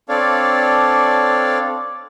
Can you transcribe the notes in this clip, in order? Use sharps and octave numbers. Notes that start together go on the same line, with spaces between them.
C4 D4 A4 C#5 D5 F5